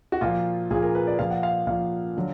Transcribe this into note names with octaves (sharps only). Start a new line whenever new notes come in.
F#4
A#2 F3 F4
A#2 F3 G#4
A#4
B4
D5
A#2 F3 F5
F#5
F5
A#2 F3 F5
D3 F#3